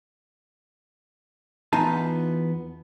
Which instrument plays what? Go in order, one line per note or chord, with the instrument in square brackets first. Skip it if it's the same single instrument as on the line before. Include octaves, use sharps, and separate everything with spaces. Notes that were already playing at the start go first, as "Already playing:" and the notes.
[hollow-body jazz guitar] E2 B3 D#4 F4 G#5 A5